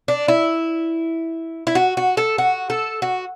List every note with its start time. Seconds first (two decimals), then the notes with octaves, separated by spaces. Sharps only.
0.08 D4
0.28 E4
1.67 E4
1.75 F#4
1.97 F#4
2.17 A4
2.38 F#4
2.70 A4
3.02 F#4